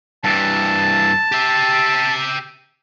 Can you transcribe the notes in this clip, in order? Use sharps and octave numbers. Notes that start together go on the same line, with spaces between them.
G2 E3 A5
G4 E5